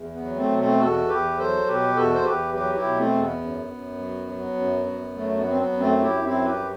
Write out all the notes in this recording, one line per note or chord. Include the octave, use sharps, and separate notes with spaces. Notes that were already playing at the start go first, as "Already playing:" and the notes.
Already playing: E2
B3
F#3
A3 C4
B2
A3 C4
E2 F#4 A4
E2 G4 B4
F#3 A4 C5
B2 G4 B4
E2 F#4 A4
C5
E2 G4 B4
F#3 G4 B4
E4 G4
B2
A3 C4
E2
B3
F#2
F#2
F#3
F#3
F#2
F#2
F#3 A3
B3
F#3 C4
B3
F#2
A3 C4
F#2 E4 G4
C4 E4
F#3
G4 B4
F#3